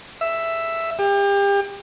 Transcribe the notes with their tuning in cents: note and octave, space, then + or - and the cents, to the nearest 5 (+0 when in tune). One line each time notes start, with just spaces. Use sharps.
E5 +5
G4 +35